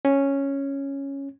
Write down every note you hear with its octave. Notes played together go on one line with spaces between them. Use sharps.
C#4